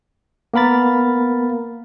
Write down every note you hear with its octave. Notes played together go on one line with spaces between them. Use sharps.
A#3 B3 A#4 B5 A6